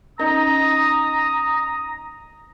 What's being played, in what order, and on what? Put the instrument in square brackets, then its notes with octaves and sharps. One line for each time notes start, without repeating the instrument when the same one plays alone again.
[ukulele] C#4 D#4 D#5 [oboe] A#5 [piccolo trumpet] D#6